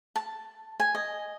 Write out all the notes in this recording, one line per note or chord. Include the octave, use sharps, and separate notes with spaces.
A5
G#5
D#5